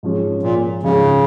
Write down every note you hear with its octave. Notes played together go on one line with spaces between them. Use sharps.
G#2 F3 C#4 G#4
A#2
G#2 C#3 F3 C#4 G#4